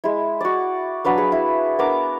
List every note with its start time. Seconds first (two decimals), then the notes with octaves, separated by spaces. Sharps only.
0.04 G#3 E4
0.41 F#4 D5
1.04 F#3 D4 B4 F5
1.18 F#4 G#4
1.32 E4
1.79 B3 D4 A#4 D6